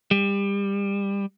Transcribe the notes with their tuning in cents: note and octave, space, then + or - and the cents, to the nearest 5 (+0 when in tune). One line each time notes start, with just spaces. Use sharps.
G3 +25